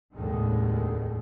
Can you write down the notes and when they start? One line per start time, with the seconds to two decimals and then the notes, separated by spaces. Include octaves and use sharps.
0.14 F1 D#2 A2 D3 D#3 G#3